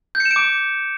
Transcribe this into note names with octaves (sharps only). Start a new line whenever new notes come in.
G6
C#7
E7
D7
D6